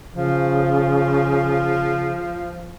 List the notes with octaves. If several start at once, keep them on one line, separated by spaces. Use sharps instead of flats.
C#3 F3